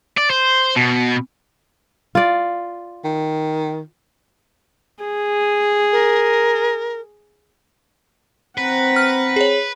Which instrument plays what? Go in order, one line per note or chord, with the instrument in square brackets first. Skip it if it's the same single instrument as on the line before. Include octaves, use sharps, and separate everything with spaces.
[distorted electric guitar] D5
C5
B2
[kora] F4 D5
[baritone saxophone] D#3
[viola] G#4
[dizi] A#4
[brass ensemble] C4 [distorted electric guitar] B4 [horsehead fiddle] F#5 A#5
[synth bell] F6
G#4 C#5